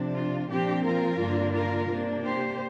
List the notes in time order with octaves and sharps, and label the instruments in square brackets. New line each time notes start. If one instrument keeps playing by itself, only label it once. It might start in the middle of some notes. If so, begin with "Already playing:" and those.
Already playing: [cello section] C3 F3 D4
F4
A#2 F3 C4 D4 G4
F4 A#4
G2 D3 A#3 D4
F4 A#4
C3 A#3 D4
G4 C5